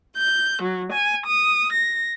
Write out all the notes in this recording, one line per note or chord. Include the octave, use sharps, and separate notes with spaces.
G6
F#3
G#5
D#6
A#6